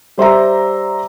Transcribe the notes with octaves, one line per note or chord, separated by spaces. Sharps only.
G3 C5 E5 A#5